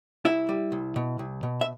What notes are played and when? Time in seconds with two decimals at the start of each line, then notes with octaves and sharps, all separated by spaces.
0.25 C2 E4 E5
0.49 G3
0.72 C2
0.96 B2
1.19 C2
1.43 B2
1.61 E5